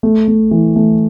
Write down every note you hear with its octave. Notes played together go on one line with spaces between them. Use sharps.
A3
A3
E3
A3